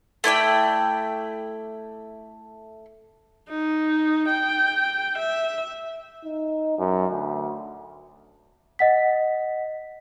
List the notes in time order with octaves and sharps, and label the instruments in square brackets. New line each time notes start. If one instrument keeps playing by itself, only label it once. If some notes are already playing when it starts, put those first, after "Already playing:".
[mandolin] A3 E4 D5 G5
[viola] D#4
G5
E5
[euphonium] D#4
F#2
D2
[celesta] D#5 F#5 B6